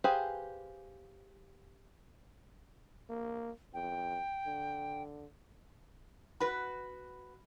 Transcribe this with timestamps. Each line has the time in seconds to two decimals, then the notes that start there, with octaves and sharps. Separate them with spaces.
0.04 G4 G#4 B4 C5 F5
3.09 A#3
3.74 F2 G5
4.47 D3
6.40 F#4 B4 B5